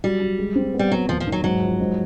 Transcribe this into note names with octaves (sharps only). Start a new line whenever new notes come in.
F#3 G3
F#3
G#3
C4
B3
G3
F#3 B3
D#2 F3
F3
D#3
F#3
G#2 F#3
F3
G#2